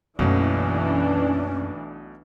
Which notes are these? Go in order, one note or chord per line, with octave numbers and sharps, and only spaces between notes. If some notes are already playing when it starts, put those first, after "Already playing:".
B1 F#2 B2 E3 A3 A#3 C#4 D4